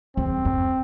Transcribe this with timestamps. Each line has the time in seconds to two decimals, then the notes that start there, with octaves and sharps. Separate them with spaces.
0.17 E2 C4
0.45 F2